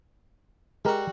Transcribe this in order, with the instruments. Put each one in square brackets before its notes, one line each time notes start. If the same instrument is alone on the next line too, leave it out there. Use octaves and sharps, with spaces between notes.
[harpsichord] G3 F#4 [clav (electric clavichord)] G#3 A#4